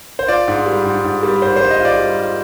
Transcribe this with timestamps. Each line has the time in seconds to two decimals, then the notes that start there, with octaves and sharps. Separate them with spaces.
0.19 C5
0.28 F4 D5
0.48 G#2
0.66 G3
0.85 G#2
1.04 G#2
1.23 G3
1.42 G#2 C5
1.56 C5
1.61 G3
1.71 D#5
1.80 F4 D5
1.99 G3
2.18 F4